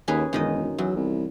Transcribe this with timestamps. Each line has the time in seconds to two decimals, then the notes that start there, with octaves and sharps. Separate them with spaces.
0.08 D#2 C#4 G#4 B4
0.33 E1 F#2 D#3 D#5
0.78 E2 F#3
0.96 C2